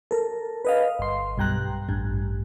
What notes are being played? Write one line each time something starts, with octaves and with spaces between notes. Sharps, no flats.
A4 A#4
B4 D#5 F5
G1 C6
B1 G2 G5 A#5 F#6
A1 G2